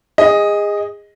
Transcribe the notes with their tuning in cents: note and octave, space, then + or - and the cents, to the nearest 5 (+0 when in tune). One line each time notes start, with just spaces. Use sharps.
G#4 -25 D#5 +0